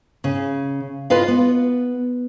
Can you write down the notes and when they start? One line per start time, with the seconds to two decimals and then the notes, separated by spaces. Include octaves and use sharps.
0.24 C#3
1.10 F4 B4 D#5 F5
1.28 B3